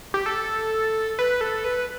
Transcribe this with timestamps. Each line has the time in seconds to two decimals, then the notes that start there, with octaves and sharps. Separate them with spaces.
0.14 G4
0.26 A4
1.19 B4
1.41 A4
1.64 B4